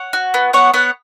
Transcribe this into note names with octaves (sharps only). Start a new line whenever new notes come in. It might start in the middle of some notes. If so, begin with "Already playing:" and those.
Already playing: C#5 F#5
F#4
B3
B3 C#5 F#5
B3 C#5 F#5